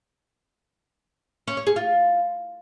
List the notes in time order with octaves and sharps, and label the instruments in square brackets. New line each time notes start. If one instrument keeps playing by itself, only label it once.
[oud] C#4
C#5
G#4
F4